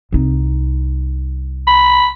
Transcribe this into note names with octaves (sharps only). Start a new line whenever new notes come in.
C2 D#4
B5